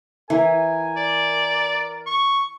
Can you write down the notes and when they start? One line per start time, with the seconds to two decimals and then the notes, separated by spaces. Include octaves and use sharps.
0.30 E3 A#4 G#5
0.97 D5
2.06 C#6